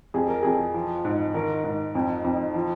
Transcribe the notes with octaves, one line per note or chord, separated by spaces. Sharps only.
F2 G#4
A#4
F2 G#4
F3
G#2
D#3 A#4
G#2
F2
F2
F3